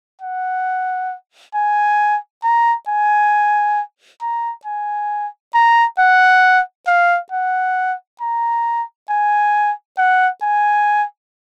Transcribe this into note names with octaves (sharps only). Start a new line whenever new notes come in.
F#5
G#5
A#5
G#5
A#5
G#5
A#5
F#5
F5
F#5
A#5
G#5
F#5
G#5